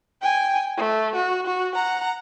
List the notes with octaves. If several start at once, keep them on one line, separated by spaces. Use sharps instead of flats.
G5 G#5
A3
F#4
F#4
F#5 A#5